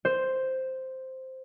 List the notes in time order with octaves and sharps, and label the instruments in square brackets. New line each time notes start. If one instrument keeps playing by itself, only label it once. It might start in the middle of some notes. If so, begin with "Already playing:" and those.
[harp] C5